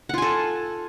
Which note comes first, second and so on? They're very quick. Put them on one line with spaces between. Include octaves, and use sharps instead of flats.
F#5 F4 G#5 A4